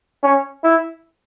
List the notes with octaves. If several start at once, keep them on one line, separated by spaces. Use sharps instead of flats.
C#4
E4